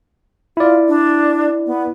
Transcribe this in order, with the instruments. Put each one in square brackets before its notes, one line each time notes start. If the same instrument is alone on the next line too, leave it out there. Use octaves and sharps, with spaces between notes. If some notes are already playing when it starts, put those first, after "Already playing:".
[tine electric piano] E4 D5 [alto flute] F4
[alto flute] D4
B3